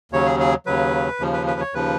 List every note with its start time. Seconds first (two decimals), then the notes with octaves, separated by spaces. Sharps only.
0.12 D#2 C#3 F#3 C#5
0.26 G#4
0.40 G#4
0.66 D#2 C#3 F#3 B4
1.20 D#2 C#3 F3
1.33 B4
1.47 B4
1.60 C#5
1.74 D#2 C#3 F3 B4